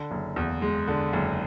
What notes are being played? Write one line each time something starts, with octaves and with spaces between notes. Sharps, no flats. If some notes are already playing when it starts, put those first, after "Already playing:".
Already playing: D3
F#1
E2
G#3
D3
F#1